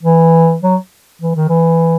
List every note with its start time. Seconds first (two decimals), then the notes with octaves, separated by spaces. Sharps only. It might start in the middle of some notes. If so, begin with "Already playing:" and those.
0.03 E3
0.62 F#3
1.22 E3
1.36 D#3
1.48 E3